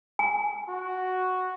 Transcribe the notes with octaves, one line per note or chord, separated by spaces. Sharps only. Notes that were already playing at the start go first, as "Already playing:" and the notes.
G#5
F#4